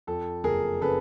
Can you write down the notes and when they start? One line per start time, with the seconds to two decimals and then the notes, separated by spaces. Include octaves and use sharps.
0.07 F2 A4
0.44 F#1 G#4 A#4
0.82 C#3 A4 B4